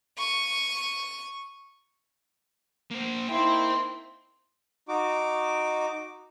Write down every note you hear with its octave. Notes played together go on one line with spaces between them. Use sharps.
C#6 D#7
A#3 C5
A#3 D#4 E4 C5 G5 C6
D#4 F#4 D6